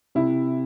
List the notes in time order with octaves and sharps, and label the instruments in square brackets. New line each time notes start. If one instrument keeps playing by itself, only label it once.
[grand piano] C3 [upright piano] E4